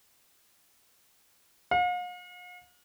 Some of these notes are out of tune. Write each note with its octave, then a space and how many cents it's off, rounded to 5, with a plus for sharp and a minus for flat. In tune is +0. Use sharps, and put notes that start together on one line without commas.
F5 +45